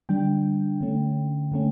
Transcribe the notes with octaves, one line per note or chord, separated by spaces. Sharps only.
D3 G3 D4 G5
D3 A3 C#4
D3 A3 C#4